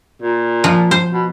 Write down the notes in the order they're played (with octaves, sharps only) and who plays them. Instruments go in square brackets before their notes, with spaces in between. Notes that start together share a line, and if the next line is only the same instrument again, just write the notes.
[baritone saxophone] A#2
[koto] F3
C5
[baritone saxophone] B2